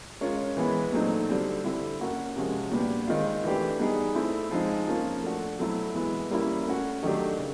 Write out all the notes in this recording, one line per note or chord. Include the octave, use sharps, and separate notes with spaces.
G#3 C#4 F4 A#4 C#5
E3 G#3 B3
A#2 F#3 A3 C4 D#4
D3 G3 C4
D3 G3 C4 E4
A#3 C#4 F#4 A#4
C3 F3 G#3 C#4 F#4
A#2 G3 B3 D4 G4
D#3 G#3 C4 F4
E3 A3 D4 G4
G3 B3 D#4 G#4
A3 C4 E4
F3 G#3 C4 D#4 G#4
F3 A#3 C#4 F4
A3 D4 F#4
B2 F#3 A3 C4 E4
E3 G#3 B3 E4
G3 A#3 C#4 E4
A3 C#4 F#4
D#3 F#3 A3 D4 G4
C#3